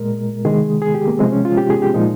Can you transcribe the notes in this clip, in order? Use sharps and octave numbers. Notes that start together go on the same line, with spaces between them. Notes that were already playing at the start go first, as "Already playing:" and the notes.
Already playing: A#2 G#3 A#4
C3 D#3 G#3 G#4
G#4
G4
A#3
C3 F3 G#3 C4
C#4
F4
G4
G#4
G4
A#2 F3 G#3 D#4